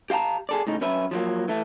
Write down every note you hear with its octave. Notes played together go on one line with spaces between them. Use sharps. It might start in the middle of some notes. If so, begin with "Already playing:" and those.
G4 F5 F#5 A5 A#5
G#4 A4 D5
A2 C#3 D#4
F#2 C#4 B4 E5
F3 F#3 A#3
E3 A3